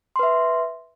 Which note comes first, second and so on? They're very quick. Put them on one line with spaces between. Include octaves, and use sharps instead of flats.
C6 B4 E5